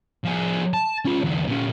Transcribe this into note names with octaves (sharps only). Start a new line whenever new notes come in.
F3 G#4
A5
C#4 F4
E2 D3
A#2 C#4